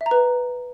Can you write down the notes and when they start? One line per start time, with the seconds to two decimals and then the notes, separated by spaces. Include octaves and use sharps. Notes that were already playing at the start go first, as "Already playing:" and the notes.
0.01 E5
0.06 A#5
0.11 B4